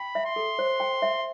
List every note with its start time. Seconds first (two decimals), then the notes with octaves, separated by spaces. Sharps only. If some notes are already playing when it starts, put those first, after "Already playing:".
Already playing: G5 B5
0.15 E5
0.26 C6
0.36 A4
0.59 C5
0.80 G5
1.02 E5